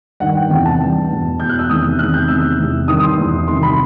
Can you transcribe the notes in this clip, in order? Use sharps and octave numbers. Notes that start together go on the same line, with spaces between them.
G2 D#3 F#5
G5
E2 C3 E3 G5
A5
G2 E3
E2 B2
E2 B2 G6
F#6
E6
E2 C3 D#3 D#6
E2 C3 D#3 F#6
G6
E2 C3 D#3 E6
E2 C3 E3
G2 D#3 D#6
D#6
C6
E2 B2
C2 C3 D#3 C6
B5